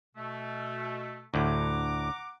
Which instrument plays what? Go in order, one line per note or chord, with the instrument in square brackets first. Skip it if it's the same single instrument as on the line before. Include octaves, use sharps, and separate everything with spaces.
[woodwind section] B2 A3
[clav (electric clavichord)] D2 A2 [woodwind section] F#5 A#5 D6